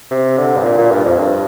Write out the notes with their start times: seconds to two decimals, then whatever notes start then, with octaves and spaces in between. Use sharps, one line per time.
0.11 C3
0.38 D3
0.57 G2
0.64 A#2
0.78 A#2
0.91 G2
1.05 F2
1.19 G2